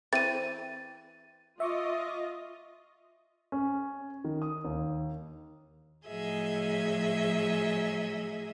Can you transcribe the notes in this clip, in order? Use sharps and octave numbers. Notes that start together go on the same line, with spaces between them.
E3 C4 A6 D#7
F4 D#5 E5 C#6 D6
C#4
D#3
D#6
D#2
A2 F3 F#3 G#4 D#5 E5